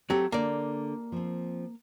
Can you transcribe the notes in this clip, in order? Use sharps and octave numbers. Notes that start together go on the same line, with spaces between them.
F#3 A3 C4 G4
D3 A#3 D5
F3 C4